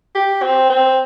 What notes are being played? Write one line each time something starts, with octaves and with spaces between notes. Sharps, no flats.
G4
C4
C4